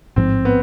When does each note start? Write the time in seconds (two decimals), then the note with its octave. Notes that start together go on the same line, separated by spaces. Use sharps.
0.16 A1 G#2 F3 C4
0.45 B3